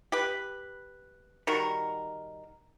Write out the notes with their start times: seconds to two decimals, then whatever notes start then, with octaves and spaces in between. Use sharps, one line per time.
0.12 G4 B4
1.47 D#3 G3 F#4 A#4